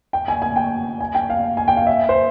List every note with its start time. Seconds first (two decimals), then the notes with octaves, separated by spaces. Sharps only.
0.13 G5
0.28 G#5
0.42 G#5
0.56 G5
1.01 G#5
1.15 G5
1.30 F5
1.57 G#5
1.68 G5
1.77 F5
1.87 E5
2.09 C5